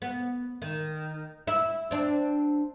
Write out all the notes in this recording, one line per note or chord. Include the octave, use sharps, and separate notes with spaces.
B3
D#3
E4
C4 D4